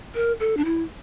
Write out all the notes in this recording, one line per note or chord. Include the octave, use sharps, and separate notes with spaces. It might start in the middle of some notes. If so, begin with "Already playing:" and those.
A#4
A4
D4
E4